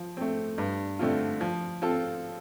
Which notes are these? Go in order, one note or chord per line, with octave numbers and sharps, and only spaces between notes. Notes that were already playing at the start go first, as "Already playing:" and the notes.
Already playing: F3
A3 C4
G2
D3 A3 C4 F4
F3
C4 F4 A4